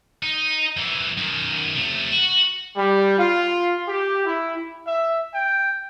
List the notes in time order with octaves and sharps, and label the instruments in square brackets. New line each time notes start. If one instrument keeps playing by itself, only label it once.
[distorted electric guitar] D#4
F#2 E3
F#2 D#3
C3 A3
F#4
[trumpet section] G3
F4
G4
E4
[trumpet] E5
G5